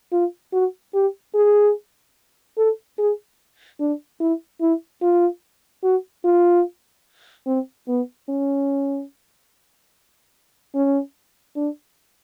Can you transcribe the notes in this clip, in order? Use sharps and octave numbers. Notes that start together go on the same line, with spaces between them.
F4
F#4
G4
G#4
A4
G#4
D4
E4
E4
F4
F#4
F4
C4
B3
C#4
C#4
D4